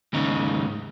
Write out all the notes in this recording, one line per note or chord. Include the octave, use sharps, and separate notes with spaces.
D#2 G#2 C#3 D#4